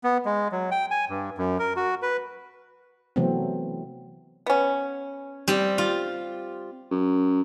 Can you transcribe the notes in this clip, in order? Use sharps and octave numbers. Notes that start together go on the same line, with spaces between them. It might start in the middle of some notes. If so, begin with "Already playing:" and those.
B3
G#3
F#3
G5
G#5
G2
F#2
A#4
F#4
B4
C3 E3 F#3 A3 B3 C4
B3 C#4
G3 C4 G4
F4
F#2